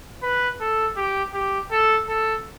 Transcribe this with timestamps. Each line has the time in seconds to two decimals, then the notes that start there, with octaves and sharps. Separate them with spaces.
0.22 B4
0.60 A4
0.97 G4
1.34 G4
1.71 A4
2.08 A4